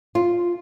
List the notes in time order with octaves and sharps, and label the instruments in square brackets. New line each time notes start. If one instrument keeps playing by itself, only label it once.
[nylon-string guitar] F4